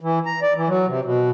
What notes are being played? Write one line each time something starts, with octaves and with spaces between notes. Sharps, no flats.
E3
A#5
D5
E3
F#3
C3
B2